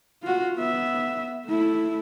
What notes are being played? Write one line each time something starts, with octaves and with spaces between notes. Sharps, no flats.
F4 F#4
B3 E5
A3 E4